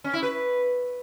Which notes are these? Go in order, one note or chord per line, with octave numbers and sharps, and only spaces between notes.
C#4
E4
B4